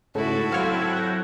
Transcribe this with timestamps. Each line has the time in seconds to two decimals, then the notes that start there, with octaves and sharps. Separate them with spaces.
0.15 G#2 C#3 A3 E4 F#4 A4
0.52 F#3 C4 C#5 F5 G5 F6
0.93 F#6 G6 A#6